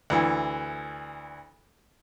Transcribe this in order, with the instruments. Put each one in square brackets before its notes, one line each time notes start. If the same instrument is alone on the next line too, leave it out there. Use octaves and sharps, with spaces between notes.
[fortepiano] D2 E3